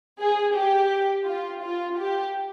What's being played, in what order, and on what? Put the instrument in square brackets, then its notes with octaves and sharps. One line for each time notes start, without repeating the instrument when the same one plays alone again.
[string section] G#4
G4
F4
F4
G4